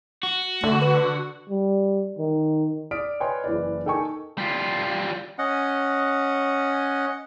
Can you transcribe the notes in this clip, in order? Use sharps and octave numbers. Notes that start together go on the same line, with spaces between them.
F#4
D3 A3
B4
G3
D#3
D5 D#6 F6 B6 D7
B4 C#5 D#5 G5 G#5 C6
F#1 E3 B4 D5
D#4 A4 A#4 G5 G#5 C#6
G3 F4
C#4 D#5 F#5